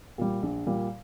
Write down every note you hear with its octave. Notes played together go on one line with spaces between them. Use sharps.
A#2 G3
A#1
A#2 G3